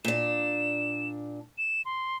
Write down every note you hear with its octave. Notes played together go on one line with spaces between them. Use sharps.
A#2 D4 E7
E7
C6